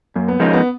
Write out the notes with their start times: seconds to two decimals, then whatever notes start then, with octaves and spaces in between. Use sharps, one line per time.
0.15 F#2 A#3
0.28 B3
0.40 F3 G#3 C#4 D#4 A#4
0.53 B3